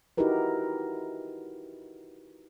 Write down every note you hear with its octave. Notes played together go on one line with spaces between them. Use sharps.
D#4 E4 F#4 G4 A#4 B4